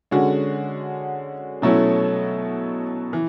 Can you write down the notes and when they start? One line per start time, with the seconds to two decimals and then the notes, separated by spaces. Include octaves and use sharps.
0.11 D3 G#3 C#4 F#4
1.62 B2 F#3 A3 C#4 E4
3.13 E3